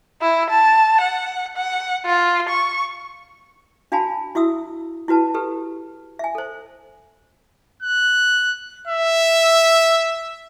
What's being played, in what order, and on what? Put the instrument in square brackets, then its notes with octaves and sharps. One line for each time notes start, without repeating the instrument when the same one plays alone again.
[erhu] E4
A5
F#5
F#5
F4
C#6
[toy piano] D4 F#4 F5 G#5 A5 B5
E4 F#4 E5 D#6 E6
E4 F#4 B4 A5
G4 A4 B4
E5 G#5
A4 C5
[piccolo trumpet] F#6
E5